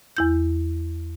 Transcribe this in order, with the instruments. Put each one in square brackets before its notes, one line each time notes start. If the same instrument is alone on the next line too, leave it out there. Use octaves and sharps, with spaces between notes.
[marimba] E2 E4 G6